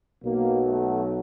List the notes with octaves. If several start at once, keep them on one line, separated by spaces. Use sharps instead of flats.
B1 B2 F#3 A#3
A3